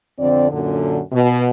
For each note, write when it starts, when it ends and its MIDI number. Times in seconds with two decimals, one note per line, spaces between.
0.19 0.47 41
0.19 0.47 50
0.19 0.47 60
0.19 0.47 74
0.51 0.99 42
0.51 0.99 46
0.51 0.99 50
1.12 1.48 47